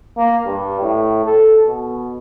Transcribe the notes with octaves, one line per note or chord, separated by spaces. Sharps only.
A#3
G2
A2
A4
B2